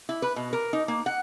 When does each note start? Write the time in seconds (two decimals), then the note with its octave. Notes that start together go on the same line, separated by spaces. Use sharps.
0.09 E4
0.22 B4
0.36 B2
0.53 A#4
0.73 D#4
0.88 A#3
1.06 F#5